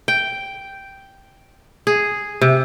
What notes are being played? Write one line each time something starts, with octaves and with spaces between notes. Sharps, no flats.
G5
G#4
C3